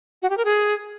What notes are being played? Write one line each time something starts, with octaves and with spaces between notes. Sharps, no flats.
F#4
G4
A#4
G#4